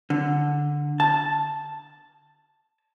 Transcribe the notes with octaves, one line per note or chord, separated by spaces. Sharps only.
D3
A5